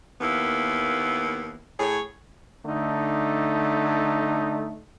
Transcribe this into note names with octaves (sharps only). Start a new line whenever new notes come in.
D#2 A#3 B3 E4
A2 G#4 C#5
D3 A3 D#4